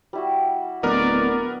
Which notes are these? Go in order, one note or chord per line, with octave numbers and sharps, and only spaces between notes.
G3 E4 F#4
D1 B3 A#4 B4 D5 D#5